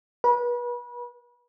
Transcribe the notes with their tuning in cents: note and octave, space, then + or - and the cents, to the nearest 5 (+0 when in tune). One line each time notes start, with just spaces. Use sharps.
B4 -30